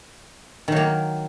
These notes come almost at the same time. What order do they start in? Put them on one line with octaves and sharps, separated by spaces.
D#3 F#3 A#3